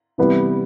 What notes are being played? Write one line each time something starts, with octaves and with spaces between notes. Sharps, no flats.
C3 E3 G3 B3